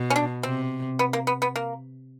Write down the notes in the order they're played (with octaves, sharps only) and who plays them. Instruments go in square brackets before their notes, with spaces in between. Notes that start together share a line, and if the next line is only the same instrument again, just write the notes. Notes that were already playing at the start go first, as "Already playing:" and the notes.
Already playing: [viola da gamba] B2
[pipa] C#4
D4
[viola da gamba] C3 [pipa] C4
[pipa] B3
A#3
B3
B3
A#3